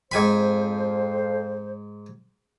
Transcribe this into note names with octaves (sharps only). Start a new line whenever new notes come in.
F2 G#2 C5 G#5 B5